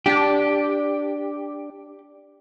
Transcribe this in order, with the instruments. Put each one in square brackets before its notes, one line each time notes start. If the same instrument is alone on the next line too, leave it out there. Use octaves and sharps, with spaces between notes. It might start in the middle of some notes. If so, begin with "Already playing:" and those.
[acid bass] D4 [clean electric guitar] G4